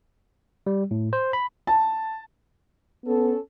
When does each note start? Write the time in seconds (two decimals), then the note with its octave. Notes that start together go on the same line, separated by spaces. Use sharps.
0.67 G3
0.91 A2
1.13 C5
1.33 B5
1.67 A5
3.06 B3 C#4 A4